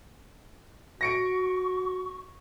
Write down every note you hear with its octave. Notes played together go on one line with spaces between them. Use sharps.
F#4 C#6 A#6 C#7 D7